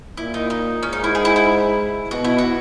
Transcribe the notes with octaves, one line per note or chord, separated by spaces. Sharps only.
A#2 E4
D#4
D#4
G#2 C#4
D#4
E4
G#4
E4
E4
B2 F#4
E4
F#4